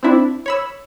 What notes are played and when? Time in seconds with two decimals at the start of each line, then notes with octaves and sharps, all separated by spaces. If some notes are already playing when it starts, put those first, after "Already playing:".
0.03 C4 D4 E4
0.46 C#5 B5 E6